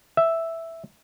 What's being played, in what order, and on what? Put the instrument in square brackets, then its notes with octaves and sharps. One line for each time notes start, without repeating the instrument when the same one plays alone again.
[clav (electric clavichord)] E5